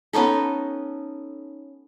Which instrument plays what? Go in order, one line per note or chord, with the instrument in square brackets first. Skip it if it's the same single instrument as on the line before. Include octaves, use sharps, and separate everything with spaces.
[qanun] B3 C#4 D#4 A4